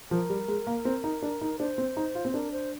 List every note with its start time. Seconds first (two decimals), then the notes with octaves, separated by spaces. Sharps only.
0.11 F3 A#4
0.29 G3
0.48 G#3
0.67 A#3
0.85 C4
1.04 D#4
1.22 D4
1.41 D#4
1.60 D4 C5
1.78 C4
1.97 D#4
2.15 F4
2.25 C4
2.34 D4 A#4
2.52 C5